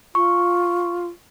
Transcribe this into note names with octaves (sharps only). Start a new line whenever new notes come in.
F4 C#6